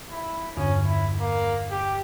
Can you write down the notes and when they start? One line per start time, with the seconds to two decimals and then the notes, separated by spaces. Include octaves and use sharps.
0.10 E4
0.57 E2 G2 D3 C#4
0.85 E4
1.20 A#3
1.71 G4